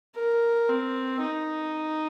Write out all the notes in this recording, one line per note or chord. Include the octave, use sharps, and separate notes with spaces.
A#4
C4
D#4